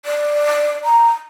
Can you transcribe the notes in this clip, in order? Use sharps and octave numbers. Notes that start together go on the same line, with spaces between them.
D5
A#5